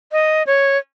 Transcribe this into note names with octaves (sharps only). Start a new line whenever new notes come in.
D#5
C#5